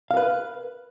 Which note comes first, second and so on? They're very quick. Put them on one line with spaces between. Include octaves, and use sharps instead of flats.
F5 A#4 B4